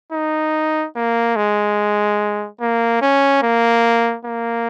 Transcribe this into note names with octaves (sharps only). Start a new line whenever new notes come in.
D#4
A#3
G#3
A#3
C#4
A#3
A#3